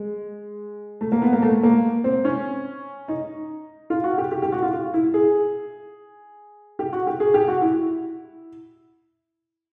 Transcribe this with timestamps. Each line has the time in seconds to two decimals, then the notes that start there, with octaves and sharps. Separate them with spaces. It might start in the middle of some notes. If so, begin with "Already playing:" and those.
Already playing: G#3
1.01 A3
1.12 A#3
1.22 B3
1.33 A#3
1.42 A3
1.63 A#3
2.04 C4
2.25 C#4
3.08 D#4
3.90 F4
4.04 F#4
4.18 G4
4.31 G4
4.42 G4
4.52 F#4
4.62 F4
4.73 F4
4.94 E4
5.14 G#4
6.79 G4
6.93 F#4
7.07 G4
7.20 G#4
7.34 G4
7.48 F#4
7.62 E4